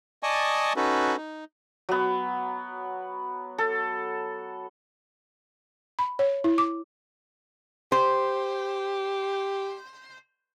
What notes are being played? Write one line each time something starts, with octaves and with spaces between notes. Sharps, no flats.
D5 D#5 G#5 A5 C#6 D#6
C#4 D#4 F#4 A4 B4
D#4
F#3 B3
A4
B5
C#5
E4
D6
G4 C5